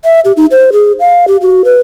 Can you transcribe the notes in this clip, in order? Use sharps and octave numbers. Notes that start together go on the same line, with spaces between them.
E5
G4
D#4
C5
G#4
F5
G4
F#4
B4